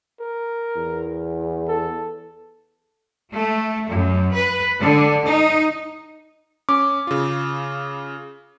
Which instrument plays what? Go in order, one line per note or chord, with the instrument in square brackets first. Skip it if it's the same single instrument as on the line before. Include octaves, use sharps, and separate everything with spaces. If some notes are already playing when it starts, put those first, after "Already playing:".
[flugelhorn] A#4
[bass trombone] E2
[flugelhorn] A4
[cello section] A3
F#2
B4
D3
D#4
[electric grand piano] C#4 [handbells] D6
[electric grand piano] C#3 F4